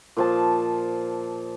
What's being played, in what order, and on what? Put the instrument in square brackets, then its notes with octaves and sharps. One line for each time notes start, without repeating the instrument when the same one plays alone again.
[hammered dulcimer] A#2 F3 A5